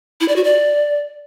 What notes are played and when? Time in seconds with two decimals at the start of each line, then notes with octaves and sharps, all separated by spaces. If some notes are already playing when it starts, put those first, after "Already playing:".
0.21 E4
0.28 D5
0.36 F#4
0.44 D5